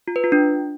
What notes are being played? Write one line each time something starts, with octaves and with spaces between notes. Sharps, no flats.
F4
B4
F4
D4